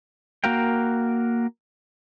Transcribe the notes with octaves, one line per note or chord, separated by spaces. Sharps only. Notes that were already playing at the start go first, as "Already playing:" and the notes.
A#3 F#4 A#4 F5 G5